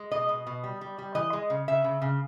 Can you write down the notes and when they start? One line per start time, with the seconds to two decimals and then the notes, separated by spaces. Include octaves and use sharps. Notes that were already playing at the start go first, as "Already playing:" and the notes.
Already playing: G#3
0.11 B2 D#5
0.29 B2
0.47 B2
0.64 G3
0.81 G3
0.98 G3
1.15 E3 D#5
1.33 G#3
1.50 C#3
1.68 C#3 E5
1.84 C#3
2.02 C#3